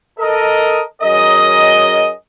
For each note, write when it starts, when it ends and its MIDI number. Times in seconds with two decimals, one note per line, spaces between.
0.19 0.82 69
0.19 0.82 70
0.19 0.82 75
1.02 2.11 54
1.02 2.11 61
1.02 2.11 68
1.02 2.11 70
1.02 2.11 75